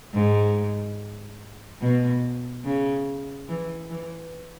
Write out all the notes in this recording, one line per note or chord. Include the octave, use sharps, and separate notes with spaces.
G#2
B2
C#3
E3
E3